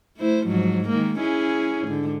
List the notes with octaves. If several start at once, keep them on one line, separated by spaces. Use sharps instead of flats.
A3 E4 C5
G#2 F3 F#3
D#3 G#3 A#3
C#4 E4 G#4
G#2 D3